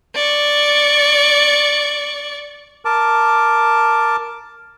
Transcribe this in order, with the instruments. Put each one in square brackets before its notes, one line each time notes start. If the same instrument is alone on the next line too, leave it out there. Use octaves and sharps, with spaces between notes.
[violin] D5 C#6
[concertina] A#4 A5 D6